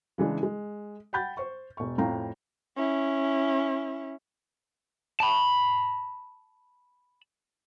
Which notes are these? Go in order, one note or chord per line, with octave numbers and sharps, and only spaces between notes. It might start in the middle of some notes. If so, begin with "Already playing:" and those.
C#3 E3 G#3 D4
G#3
F#5 G5 B5 G6 A6
C5 C#6
E1 C#6
F2 A2 F5 G5 A#5
C#4 E4
A5 B5